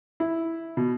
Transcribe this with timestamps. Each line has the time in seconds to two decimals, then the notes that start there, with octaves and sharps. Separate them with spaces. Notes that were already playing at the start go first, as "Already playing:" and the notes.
0.20 E4
0.77 B2